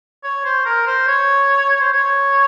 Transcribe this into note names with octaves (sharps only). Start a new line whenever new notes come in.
C#5
C5
A#4
C5
C#5
C5
C#5